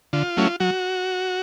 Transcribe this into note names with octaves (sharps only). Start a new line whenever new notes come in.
D3 F4
F#3 A3 C#4 E4
F#3 F#4